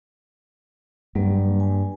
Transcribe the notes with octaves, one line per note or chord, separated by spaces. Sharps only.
G2 F#3 G3 A#3
G#5